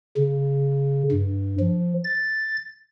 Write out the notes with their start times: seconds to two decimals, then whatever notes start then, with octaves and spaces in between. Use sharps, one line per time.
0.17 C#3
1.11 G2
1.59 F3
2.04 A6